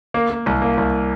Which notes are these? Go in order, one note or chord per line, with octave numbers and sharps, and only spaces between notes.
A#3
A#3
C2
A#3
C2